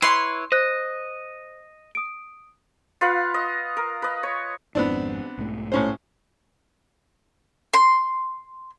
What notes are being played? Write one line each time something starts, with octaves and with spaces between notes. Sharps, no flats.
E4 B4 C#5 C6
C5 D#5 F#6
D#6 D7
F4 B4 F5 F#5
D#5
A#4
B4 D#5
C#5
G#1 F2 G#2 B3 C4 D4
B1 G#2 A3
A2 C#4 C5
C6